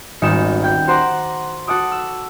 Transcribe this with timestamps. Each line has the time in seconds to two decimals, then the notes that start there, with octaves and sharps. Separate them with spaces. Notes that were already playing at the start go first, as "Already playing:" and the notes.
0.22 D#1 G#1 D#4 F#4 C#7 E7
0.63 G5 G6
0.87 F#4 C5 F#5 A#5 C6 D6
1.67 F#4 A4 F#5 D6 D#6
1.92 E6